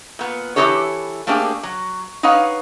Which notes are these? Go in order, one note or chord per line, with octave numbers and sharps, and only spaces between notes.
A#2 B3
E3 B3 E4 G4 A4 C#5
A3 A#3 C4 D4 G4 G#4
F#3
D#4 B4 C#5 F5 F#5